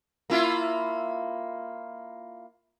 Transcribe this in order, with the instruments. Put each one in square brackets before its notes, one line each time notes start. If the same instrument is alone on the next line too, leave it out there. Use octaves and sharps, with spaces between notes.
[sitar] A#3 E4 F4